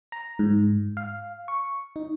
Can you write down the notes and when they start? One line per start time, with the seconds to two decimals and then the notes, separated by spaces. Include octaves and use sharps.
0.12 A#5
0.39 G#2
0.97 F5
1.48 C#6
1.96 D#4